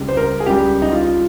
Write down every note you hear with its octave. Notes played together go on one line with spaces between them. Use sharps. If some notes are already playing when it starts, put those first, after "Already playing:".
Already playing: C#2 C#3 G3
C5
A#4
G#4
C#2 C#3 G3 G4
D#4
F4